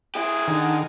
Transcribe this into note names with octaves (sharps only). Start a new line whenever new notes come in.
E4 G4 G#4
D3 D#3